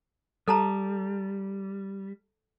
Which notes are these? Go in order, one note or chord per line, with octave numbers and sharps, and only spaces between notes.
G3 A4 A5 A#5